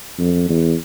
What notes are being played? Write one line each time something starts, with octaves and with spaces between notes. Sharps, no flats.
F2
E2